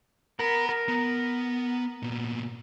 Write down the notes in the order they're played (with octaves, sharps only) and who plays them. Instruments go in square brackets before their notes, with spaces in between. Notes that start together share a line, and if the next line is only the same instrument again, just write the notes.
[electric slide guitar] A#4 [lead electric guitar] F#5 B5
[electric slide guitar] A#4
[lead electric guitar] B3
A#2 B3